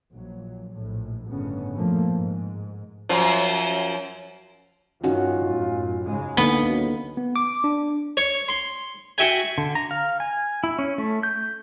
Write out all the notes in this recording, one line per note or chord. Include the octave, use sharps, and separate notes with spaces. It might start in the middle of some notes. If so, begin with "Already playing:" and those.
A#1 F#3
A#1 A2
G1 A2 C#3 B3 C#4
A#2 F3 A3 A#3
G#2
F#2 F3
G2 D#3 C#4 D#4 F4 F#4
F#2 A2
G#2 C#3 G#3
C#2 D3 A#3 B3 D#4
F#2
B3
D6
D4
C#5
C6
F#4 E5 G5 G#5
D3
A#5
F5
G#5
E4
C#4
A3
G6